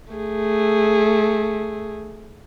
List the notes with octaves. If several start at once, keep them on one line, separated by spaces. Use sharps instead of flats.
A3 G#4